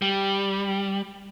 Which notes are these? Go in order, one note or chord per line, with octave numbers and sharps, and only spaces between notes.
G3